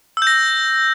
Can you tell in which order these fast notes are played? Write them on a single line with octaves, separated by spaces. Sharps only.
E6 G6 A#6